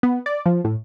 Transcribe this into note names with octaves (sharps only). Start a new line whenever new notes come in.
B3
D5
F3
A2